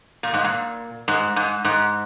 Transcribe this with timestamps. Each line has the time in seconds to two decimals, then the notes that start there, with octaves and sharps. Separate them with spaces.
0.23 A#2
0.34 G#2
0.44 A#2
1.08 G#2
1.36 G#2
1.64 G#2